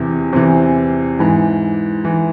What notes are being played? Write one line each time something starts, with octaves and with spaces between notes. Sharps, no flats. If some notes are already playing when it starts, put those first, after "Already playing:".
Already playing: E2 C3 E3
E2 C3 E3 C5
G#2 E3
E3